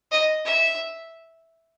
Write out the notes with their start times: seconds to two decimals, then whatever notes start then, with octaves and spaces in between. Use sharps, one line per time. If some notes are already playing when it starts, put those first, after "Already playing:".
0.11 D#5
0.45 E5